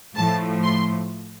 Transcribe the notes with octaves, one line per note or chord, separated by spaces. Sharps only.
A2 F3 A3 A5
C6